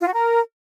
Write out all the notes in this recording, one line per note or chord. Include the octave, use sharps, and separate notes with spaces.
F4
F#4
A#4